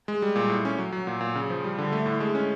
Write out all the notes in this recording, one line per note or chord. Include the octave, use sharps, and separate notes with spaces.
G#3
G3
A#2
A2
C#4
F#3
F#3
A#2
A#2
C#3
F3
G3
D3
A3
A2
G#3
C#4